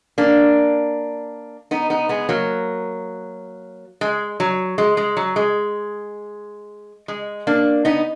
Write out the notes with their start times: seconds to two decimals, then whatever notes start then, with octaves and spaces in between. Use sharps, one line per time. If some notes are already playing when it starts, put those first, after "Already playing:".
0.18 A#3 D4
1.71 B3 D#4
1.90 B3 D#4
2.09 G#3 B3
2.29 F#3 A#3
4.01 G#3
4.40 F#3
4.78 G#3
4.97 G#3
5.17 F#3
5.36 G#3
7.08 G#3
7.47 A#3 D4
7.85 B3 D#4